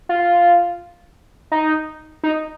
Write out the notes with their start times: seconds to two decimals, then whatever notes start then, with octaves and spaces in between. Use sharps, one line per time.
0.09 F4
1.52 D#4
2.23 D#4